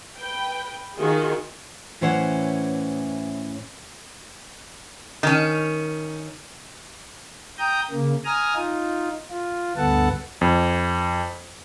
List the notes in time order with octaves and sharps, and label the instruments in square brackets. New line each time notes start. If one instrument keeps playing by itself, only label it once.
[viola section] B4 G5
D#3 F4 F#4 G#4
[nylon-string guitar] A2 E3 C#4 C5 C#5 F#5
[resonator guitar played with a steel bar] D#3 C#4
[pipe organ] G5 A#5 D#6 G6
C#3 A#3
G#5 A#5 D#6 F6
D#4 F4
F4
D2 G2 B3 A4 F#5 A5
[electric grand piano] F2